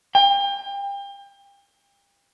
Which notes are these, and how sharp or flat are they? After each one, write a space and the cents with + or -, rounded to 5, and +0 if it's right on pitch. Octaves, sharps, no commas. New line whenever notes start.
G5 +35